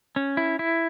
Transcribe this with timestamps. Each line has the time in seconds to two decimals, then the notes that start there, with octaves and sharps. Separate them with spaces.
0.16 C#4
0.37 E4
0.59 E4